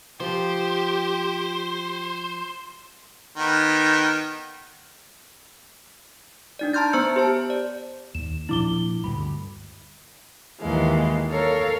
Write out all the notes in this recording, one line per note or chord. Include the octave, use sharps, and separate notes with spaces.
F3 G4 C5
D#3 B3
D4 D#4 D5
A5 A#5 C6 F6 G6 A6
B3 C5 A#5 E6 C#7
G4 C5 A5
D5
D#2 E7
A#2 F3 D4 E4 D6 G7
D2 G2 B5
D#2 D#3 E3 G#3 F5
A4 A#4 C#5 F5